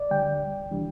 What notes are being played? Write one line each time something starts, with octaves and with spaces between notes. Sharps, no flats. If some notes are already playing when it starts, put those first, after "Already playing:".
Already playing: D2 D5
D3 G3 G5
D2
C3 E3 G3 D4